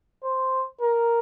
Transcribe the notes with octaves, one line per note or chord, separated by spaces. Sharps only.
C5
A#4